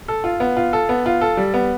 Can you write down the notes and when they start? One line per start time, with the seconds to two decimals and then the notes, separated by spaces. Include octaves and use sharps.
0.08 A4
0.24 F4
0.40 B3
0.57 F4
0.73 A4
0.89 B3
1.06 F4
1.21 A4
1.37 G3
1.54 B3